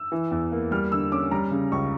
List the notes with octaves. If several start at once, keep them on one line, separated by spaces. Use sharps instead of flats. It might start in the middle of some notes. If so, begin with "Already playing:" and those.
Already playing: E6
E3
E2
A#3
G3 F6
D3 E6
C#4 D6
G3 A#5
C#3
C#2 C#6